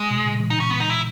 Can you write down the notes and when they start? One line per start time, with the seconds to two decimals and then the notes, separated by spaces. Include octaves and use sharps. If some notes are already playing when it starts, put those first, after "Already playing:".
Already playing: G#3
0.10 B2
0.25 A#2 C#3
0.40 E3 G#3
0.50 D#4
0.60 C#4
0.70 B3
0.80 D#4
0.90 E4